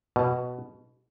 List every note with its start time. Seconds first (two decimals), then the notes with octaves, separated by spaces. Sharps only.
0.16 B2